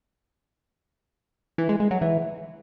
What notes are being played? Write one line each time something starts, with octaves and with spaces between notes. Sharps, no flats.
E3
G#3
G#3
F#3
E3